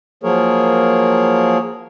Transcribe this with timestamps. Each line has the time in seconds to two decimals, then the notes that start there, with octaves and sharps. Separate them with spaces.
0.23 F3 F#3 A#3 G#4 A#4 C#5